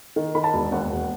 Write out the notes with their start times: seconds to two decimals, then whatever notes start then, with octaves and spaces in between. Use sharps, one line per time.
0.16 D#3
0.35 D#3 B5
0.44 A5
0.53 E1
0.72 D#2 F#5
0.91 E1